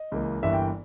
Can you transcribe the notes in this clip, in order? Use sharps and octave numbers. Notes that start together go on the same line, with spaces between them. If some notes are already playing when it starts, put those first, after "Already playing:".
Already playing: D#5
C#2 C#3 E3 A#3
G1 G2 E3 A#3 E5
G5